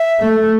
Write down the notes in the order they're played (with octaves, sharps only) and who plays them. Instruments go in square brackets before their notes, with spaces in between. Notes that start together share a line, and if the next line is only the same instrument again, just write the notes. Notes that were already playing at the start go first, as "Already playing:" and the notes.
Already playing: [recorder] E5
[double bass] A3